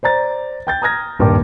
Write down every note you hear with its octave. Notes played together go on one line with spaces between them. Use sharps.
C5 D5 A#5 A6
G5 G6 A6
A#5 D#6 F6 G#6 A#6
D#1 G2 A#4 D5 G5 D6